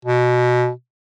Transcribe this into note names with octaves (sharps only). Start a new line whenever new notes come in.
B2